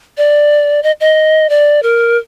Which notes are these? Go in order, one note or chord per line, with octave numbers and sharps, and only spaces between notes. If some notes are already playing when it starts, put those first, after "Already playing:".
D5
D#5
D#5
D5
A#4